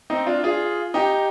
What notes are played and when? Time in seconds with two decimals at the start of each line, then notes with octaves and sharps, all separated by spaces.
0.10 C4 D#4
0.26 D4 F4
0.44 F4 G#4
0.94 D#4 G4